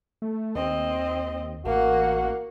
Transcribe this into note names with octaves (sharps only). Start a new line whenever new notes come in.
A3
D#2 C4 D#5
A1 A#3 F#4 F#5